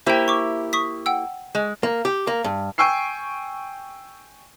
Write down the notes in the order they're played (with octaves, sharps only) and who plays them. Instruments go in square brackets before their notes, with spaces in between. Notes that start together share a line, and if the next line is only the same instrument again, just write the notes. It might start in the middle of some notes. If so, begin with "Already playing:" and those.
[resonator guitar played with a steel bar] A#3 E4 G4 [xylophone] C5 G5
[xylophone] C#6 D6
C#6 D#6 B6
F#5 G5 E6
[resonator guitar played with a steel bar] G#3
[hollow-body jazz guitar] A#3
G4
A#3
G2
[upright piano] G5 G#5 C#6 E6 C7